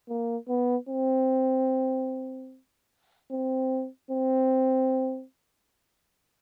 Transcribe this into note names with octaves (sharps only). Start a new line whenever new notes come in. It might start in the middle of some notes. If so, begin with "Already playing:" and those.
A#3
B3
C4
C4
C4